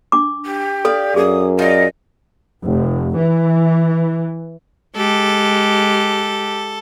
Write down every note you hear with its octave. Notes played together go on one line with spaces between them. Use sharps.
D4 D6
G4
A4 D5 F5
F#2 G#4 D#6
F4 D5 D#5
F1
E3
G#3 G4 A4